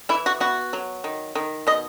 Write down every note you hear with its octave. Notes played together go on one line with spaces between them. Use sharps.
E3 E4
F#4
B3 F#4
F#3
D#3
D#3
B2 D#5